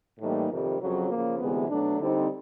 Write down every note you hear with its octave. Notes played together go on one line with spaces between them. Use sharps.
A2 E3 G3 A#3 D#4
F2 C3 D#3 G3
F2 C#3 F#3
C#3 F3 A#3
D2 C3 E3 G#3 B3
B2 F#3 A3 D4
D3 G3 C4 D#4